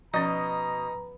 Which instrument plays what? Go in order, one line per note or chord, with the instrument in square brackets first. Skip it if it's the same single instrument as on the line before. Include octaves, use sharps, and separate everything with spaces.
[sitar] B2 [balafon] F3 C#4 [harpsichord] D#4 [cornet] A#5